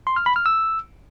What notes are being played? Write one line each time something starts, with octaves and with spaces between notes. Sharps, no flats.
C6
F6
B5
F6
E6